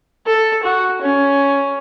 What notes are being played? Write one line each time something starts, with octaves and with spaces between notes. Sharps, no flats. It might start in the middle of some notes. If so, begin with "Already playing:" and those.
A4
F#4
C#4